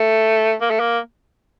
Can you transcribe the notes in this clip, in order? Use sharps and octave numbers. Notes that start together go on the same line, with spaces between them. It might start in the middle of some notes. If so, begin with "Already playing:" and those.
Already playing: A3
A#3
A3
A#3